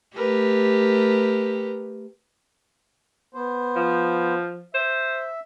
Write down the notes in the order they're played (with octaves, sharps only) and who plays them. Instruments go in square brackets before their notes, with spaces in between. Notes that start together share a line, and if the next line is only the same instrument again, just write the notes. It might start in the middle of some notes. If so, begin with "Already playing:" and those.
[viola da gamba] A3 G4 [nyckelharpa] A#4 B4
[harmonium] B3 C5
[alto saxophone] F3
[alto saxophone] C5 [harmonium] E5